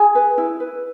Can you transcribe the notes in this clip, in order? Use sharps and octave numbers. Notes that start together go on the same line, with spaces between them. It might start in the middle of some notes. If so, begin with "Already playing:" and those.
Already playing: G#4 G#5
B4
E4
B4